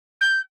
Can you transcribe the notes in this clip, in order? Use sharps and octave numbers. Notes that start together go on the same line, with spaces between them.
G6